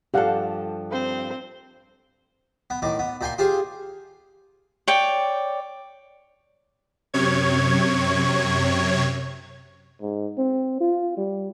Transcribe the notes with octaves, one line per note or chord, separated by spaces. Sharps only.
G2 F3 G4 A4 F5 F#5
C4 C5
B3
A2 D#3 D6
B3
A#2 G5 G#5 C6
F4 G4 G#4 C5
C#5 D5 G5
F#2 C3 C#5 G#6
G#2
C4
F4
G3